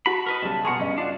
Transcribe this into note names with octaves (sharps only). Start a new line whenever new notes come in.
F#4 A5 B5
A#4 B4 D#5
B1 C#3 G3 A5
B2 G#4 A#4 F#5 C6 C#6
G2 C#4 D#5
D4 F4 F#4 D5